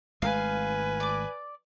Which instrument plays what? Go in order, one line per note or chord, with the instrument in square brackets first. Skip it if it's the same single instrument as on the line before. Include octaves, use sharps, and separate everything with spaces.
[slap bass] G#1 G#3 A3 [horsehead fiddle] B4 G#5 [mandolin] F5
[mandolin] D5 D6